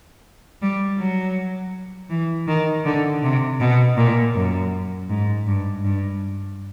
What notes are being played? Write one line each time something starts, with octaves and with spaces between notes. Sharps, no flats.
G3
F#3
E3
D#3
D3
C3
B2
A#2
F#2
G#2
G2
G2